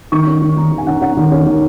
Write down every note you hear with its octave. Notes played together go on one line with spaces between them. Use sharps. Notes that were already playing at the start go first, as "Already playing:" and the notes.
D#3 C#6
C#4
D#3
D#3 A#5
D#3
G#5
C#4 F#5
C#4 F#5
D#3
C#4
D#3